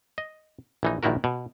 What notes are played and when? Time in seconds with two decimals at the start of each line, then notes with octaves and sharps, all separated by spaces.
0.18 D#5
0.83 A#1 E3 D#4
1.03 A#1 A#2 D#3 E4 F#4 A#4
1.24 B2